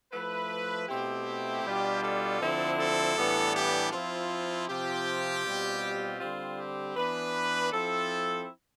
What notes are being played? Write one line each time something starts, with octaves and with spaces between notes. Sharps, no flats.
F3 A3 E4 B4
B2 A3 C4 E4 G4
B2 G3 D4 F4
A4
D3 F3 C4 E4
A4
A2 E3 G3 B3 D4
G4
F3 C4 E4 F4
C3 F3 C4 F4 G4
B2 G3 C4 F4
D3 G3 C4 F4
G4
E3 B3 D4 B4
F3 C4 E4 A4